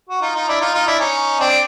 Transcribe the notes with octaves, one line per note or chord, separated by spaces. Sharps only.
F#4
D#4 F4
D#4 F4
D4 E4
D#4 F4
D#4 F4
D4 E4
C#4 D#4
C4 D4